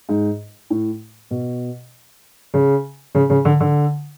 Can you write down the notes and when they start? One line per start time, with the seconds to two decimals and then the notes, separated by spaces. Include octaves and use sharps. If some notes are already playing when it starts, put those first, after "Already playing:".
0.09 G#2
0.70 A2
1.31 B2
2.54 C#3
3.15 C#3
3.30 C#3
3.45 D3
3.60 D3